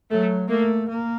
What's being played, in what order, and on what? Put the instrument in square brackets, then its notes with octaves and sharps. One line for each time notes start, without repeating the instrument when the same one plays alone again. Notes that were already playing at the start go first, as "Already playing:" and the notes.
[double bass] F#3 [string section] A3
[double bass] A3 [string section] A#3
[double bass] A#3